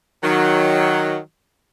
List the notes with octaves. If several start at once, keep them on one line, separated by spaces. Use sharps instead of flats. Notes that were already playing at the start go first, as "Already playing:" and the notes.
D#3 F#3